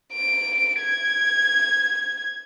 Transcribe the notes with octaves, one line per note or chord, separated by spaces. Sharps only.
D7
G#6